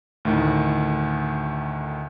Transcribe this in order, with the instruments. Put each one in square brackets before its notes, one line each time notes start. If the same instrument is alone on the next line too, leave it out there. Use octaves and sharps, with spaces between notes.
[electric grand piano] D2 A2 D#3